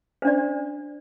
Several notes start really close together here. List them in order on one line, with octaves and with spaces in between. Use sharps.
C5 D4 D5